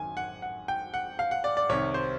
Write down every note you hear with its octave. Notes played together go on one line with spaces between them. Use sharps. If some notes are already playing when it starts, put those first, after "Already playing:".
Already playing: G#1 F#2 D#3 G#5
F#5
F#5
G5
F#5
F5
F#5
D5
D5
C2 C3 D#3 C#5
C5